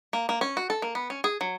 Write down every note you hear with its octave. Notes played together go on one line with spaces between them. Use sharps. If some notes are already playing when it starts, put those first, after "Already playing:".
A#3
A#3
C#4
F#4
A4
A#3
B3
C#4
G#4
F#3